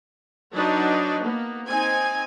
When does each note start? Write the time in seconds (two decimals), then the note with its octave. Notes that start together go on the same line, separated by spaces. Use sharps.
0.54 F#3 D4 D#4 F#4 B4
1.22 A#3 B3
1.66 C4 D#4 G#5